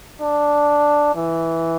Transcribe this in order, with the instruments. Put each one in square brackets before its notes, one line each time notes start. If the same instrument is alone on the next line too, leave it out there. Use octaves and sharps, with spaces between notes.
[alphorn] D4
E3